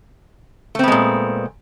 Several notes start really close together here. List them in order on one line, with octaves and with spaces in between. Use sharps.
A3 C4 B3 G#3 A#2